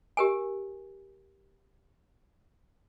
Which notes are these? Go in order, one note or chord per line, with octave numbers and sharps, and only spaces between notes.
G4 A#4 G#5